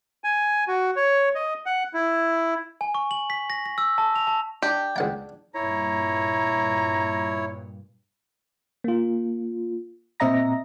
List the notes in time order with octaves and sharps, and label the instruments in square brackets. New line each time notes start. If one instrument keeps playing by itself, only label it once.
[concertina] G#5
F#4
C#5
D#5
F#5
E4
[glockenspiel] G#5
C#6
F#7
B6
A#6
A#6
E6
A5
F7
A5
[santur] D4 [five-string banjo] G4
[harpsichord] C#2 F#5 G5
[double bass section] G2 A#2 [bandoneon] E4 C#5 [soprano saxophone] A#5
[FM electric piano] A#3 F4
A#2 C4 D#5 E5 A#5 A#6